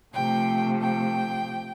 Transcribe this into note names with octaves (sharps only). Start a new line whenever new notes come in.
C3 F3 A3 G5
G5